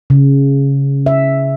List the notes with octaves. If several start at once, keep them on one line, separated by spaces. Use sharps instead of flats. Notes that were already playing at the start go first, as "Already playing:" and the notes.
C#3
E5